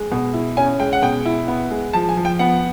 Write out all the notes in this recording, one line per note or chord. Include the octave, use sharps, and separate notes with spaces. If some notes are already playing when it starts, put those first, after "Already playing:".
Already playing: G#3
B2
E4
C#4 G#5
G#3 G5
F#5
B2 G5
E4
B3
G#3
F3 A5
G#5
F3
G5
B3 F#5